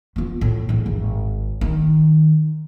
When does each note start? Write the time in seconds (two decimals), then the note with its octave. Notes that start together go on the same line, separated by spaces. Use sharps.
0.16 B3 F4
0.41 A2
0.69 E2 A2
0.86 G#1
1.61 D#3